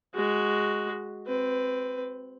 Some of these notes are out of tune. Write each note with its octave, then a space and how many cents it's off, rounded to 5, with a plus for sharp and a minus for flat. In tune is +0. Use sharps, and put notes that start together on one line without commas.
G#3 +0 F#4 +0
C4 +0 B4 +20